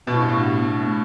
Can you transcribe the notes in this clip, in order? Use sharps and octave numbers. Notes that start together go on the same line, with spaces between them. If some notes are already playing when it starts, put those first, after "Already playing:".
B2 B3
A2
G2
A2
A3